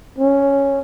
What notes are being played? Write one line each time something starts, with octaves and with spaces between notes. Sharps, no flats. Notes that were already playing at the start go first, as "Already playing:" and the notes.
C#4